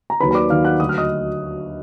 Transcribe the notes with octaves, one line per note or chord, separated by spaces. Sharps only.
A#5
D#2 D#3 F#3 B4 B5
B5
D5 D6
D#2 D#3 F#3 F5 F6
F#5 F#6
D2 D3 F#3 D#6
F6
D#5 D#6